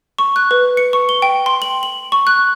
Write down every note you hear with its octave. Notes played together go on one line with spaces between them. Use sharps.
C#6
F#6
B4
C#7
C#6
G7
G5
C6
F#7
F#7
C#6
F#6